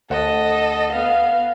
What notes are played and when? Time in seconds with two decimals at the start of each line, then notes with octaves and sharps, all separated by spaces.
0.10 D2 A4 D#5 F#5
0.93 B3 F5